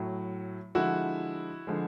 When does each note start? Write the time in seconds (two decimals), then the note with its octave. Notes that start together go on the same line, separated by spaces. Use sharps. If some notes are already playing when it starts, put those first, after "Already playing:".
Already playing: A2 F#3
0.75 D3 F3 G#3 E4 F#4
1.67 D3 F3 G#3